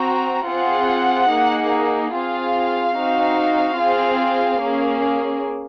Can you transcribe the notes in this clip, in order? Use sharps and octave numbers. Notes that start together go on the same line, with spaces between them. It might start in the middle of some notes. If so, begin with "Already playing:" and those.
Already playing: C4 F#4 A#5
C4 F4 G#4 F#5
A#3 D#4 G#4
C4 F4 G#4 F5
C4 D#4 F#4
C4 F4 G#4
A#3 C#4 G#4